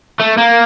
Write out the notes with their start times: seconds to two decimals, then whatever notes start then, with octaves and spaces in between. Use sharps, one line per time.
0.20 A3
0.38 A#3